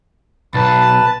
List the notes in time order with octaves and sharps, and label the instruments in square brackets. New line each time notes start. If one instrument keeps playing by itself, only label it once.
[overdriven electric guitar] B1 [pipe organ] B4 A5